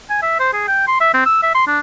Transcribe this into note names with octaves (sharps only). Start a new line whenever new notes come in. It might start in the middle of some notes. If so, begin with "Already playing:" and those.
G#5
E5
C5
G#4
G5
C6
E5
C4
E6
E5
C6
D4